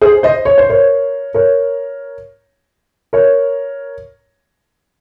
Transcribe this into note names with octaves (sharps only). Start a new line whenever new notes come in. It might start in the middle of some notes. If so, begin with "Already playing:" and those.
G#4 C5
C5 D#5
C#5
C5
A#4 C#5
A#4 C#5
A#4 C#5